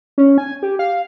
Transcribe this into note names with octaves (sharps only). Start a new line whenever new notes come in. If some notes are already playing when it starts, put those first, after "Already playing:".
C#4
G#5
G4
F5